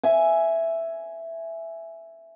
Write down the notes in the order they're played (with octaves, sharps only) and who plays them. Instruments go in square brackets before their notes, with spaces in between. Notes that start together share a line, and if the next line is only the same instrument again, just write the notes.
[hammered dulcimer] E5 G#5